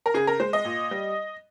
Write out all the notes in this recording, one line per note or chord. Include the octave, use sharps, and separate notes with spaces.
A#4
C#3 G#4
A#4
G#3 C5
D#5
A#2
G3